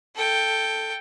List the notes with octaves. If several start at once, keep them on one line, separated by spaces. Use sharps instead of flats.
A4 G5